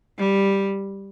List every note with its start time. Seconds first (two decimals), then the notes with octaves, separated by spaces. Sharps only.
0.18 G3